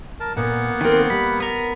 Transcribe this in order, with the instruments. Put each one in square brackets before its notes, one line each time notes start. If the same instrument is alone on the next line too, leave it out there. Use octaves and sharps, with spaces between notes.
[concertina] A#4 A5
[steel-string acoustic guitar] A#2 [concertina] A#3 B3 F#5
[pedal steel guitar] D#3 C4 [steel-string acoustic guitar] A#4 G5
[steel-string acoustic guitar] G3 [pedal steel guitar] B5
[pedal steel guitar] B3 A#4